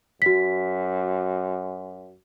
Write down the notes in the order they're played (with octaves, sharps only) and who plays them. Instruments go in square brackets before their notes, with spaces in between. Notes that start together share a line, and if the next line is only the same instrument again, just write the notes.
[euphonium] F#2 [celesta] F#4 B6